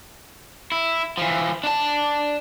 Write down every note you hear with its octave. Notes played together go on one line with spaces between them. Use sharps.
E4
E3 F3
D4 A5